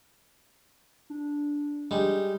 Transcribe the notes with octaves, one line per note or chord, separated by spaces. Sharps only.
D4
G3 G#3 D#4